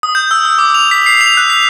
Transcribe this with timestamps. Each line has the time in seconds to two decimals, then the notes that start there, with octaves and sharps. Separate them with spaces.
0.03 D#6
0.15 G6
0.31 E6
0.45 E6
0.59 D6
0.75 F7
0.91 B6
1.06 C7
1.21 F7
1.37 F#6
1.50 B6